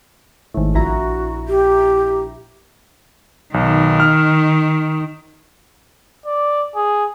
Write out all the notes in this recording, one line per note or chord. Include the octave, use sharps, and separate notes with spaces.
G#1 A2
A#1 E4 F#4 A#5
G4
B1 D#3
F6
D5
G#4